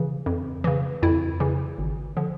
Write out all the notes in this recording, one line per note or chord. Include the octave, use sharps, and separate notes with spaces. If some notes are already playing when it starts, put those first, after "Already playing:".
Already playing: C#3 E3
F2
C#3 E3
F2 E4
C#3 E3
G#1
D3 F3